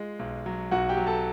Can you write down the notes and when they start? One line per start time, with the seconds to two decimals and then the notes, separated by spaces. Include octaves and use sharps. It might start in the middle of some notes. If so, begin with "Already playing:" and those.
Already playing: G#3 F4
0.19 B1
0.46 F#3
0.71 B1 F#4 F#5
0.89 G4 G5
0.97 F#3
1.07 A4 A5